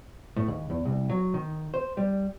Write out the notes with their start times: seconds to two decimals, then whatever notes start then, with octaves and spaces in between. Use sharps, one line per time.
0.36 A2
0.48 D#2
0.70 E2
0.85 C2
1.10 F#3
1.34 D#3
1.74 C5
1.97 G3